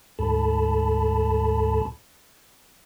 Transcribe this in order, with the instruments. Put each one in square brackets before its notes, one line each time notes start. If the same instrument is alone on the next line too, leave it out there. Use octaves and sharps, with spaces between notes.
[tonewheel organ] D2 G#2 A4 A5 B5